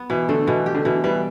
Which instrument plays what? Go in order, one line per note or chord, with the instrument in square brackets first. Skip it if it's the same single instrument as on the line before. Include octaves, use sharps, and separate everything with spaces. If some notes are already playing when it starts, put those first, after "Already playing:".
Already playing: [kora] B3
[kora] B2 [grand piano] E3
[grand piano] D3 [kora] A3
[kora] B2 [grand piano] E3
[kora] G4
[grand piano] D3
[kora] B2 [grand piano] E3
[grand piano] E3 [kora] G3